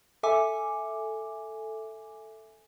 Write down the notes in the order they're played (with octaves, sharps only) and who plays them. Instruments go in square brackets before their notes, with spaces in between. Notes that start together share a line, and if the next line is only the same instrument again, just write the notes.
[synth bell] A4 E5 G#5 D6